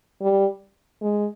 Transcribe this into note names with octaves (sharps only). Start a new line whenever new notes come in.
G3
G#3